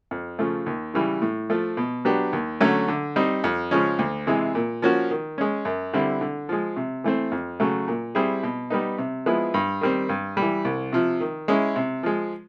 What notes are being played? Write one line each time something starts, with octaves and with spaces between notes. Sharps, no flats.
F2
C#3 F3 A3
D#2
C#3 E3 G3
A2
F3 A3
B2
F#3 B3 D4 G4
D#2
D3 F#3 A3 C#4
D3
G3 C4 D#4
F2
C#3 F3 G#3 C#4
D2
C3 E3 G#3
A#2
F3 A#3 C#4 F#4
D#3
G#3 C#4
F#2
D3 G3 C4 E4
D3
F3 G#3
C3
E3 A3 C4
F2
C#3 F#3 A3
A#2
G3 C4 E4 G#4
B2
G3 B3 D#4
C3
F3 G#3 B3 E4
G2
D#3 G3 C4
G2
E3 G3
C2
C3 F3
D#3
G#3 C#4 E4
C3
F3 G#3